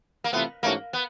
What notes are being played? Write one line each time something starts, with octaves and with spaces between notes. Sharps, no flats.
A#3
C3 E3 A3 B3 C4 F4
G#2 E3 A3 A#3 C#4 F#4
B3